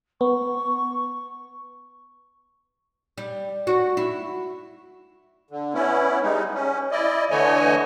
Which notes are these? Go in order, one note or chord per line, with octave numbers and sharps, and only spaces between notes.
B3 C#6
G3
F#4
E4
D3
B3 C#4 E4
G3 G#3 D#4
C#4
E4 D5 D#5
D3 E3 A3 C#5 D#5 G#5